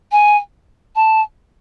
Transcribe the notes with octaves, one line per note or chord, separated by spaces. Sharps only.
G#5
A5